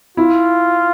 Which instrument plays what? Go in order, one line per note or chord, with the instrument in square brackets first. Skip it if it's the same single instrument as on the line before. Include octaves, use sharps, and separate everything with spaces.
[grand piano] E4 [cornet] F4